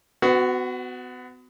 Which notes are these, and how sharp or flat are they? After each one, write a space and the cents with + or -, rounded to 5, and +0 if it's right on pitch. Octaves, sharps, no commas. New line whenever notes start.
B3 +35 F#4 +0